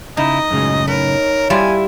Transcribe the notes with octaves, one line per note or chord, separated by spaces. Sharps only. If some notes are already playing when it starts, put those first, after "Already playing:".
C#3 D#4 E4 D#5
C#2 F#2 A2 C#3 F#3 G#3
D#4 A#4 B4 C#5
G3 E4 F4 G#5